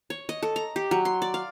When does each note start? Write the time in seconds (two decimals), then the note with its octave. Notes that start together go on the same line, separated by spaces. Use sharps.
0.10 C#5
0.29 D#5
0.43 A4
0.56 A#5
0.76 G4
0.91 F#3
1.05 C6
1.22 D5
1.34 F5